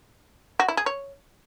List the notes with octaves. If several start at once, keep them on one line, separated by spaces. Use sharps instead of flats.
F#4
E4
G#4
C#5